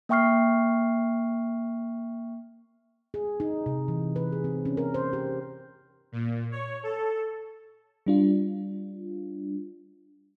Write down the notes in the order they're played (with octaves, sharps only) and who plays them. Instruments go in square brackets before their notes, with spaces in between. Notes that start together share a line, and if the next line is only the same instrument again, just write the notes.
[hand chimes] A#3 E5 G5 C#6 F6 C7
[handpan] G#4
D#4
C3
E3
B4
G#4
C4
C#4
A#4
C5
G4
[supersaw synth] A#2
C#5
A4
[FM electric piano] G3 D4 F4